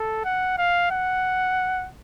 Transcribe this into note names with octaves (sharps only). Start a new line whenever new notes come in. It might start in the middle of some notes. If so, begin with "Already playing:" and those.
Already playing: A4
F#5
F5
F#5